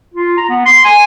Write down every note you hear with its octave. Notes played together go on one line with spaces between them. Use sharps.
F4
A#5
B3
C6
G#5